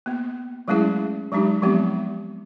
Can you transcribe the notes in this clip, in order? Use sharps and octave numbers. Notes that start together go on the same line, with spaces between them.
A#3 B3
F#3 G#3 A3 C#4 E4 G#4
F#3 G#3 D4 D#4 G4
F3 F#3 G#3 B3 C4 G4